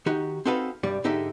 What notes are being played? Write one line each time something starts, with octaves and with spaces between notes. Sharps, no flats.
D#3 D#4 F#4 G4
C4 D#4 F#4 A4 B4 F5
C2 G2 G3 G4 D5
G#2 D3 D#4 G4 A4 E5